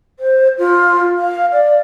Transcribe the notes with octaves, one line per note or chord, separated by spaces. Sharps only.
C5
F4
F5
D5